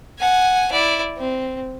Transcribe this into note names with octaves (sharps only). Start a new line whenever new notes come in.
F#5 G#5
E4 D5
C4